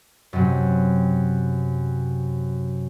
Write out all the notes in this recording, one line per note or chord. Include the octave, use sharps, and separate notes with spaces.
F#2 C3